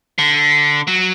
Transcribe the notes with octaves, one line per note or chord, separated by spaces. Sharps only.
D3
F#3